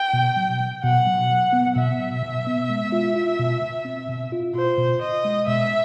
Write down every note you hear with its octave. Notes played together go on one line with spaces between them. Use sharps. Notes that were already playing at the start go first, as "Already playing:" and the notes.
Already playing: G5
B2
F#3
F#3
B2 F#5
F#3
F#3
B3
B2 E5
F#3
B2
B3
G#3
F4
F4
B2
B2
C4
B2
F4
F4 C5
B2
B2 D#5
G#3
B2 E5